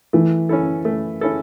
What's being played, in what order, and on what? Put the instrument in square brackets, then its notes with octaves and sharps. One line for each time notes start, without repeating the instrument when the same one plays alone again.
[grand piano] E3 [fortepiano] A3
[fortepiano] C#4 E4 A4
A3
C#4 E4 A4